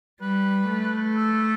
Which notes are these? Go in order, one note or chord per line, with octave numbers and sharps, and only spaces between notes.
G3 B4
A3
A4